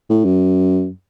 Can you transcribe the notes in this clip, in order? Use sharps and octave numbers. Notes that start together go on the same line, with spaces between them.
A2
F#2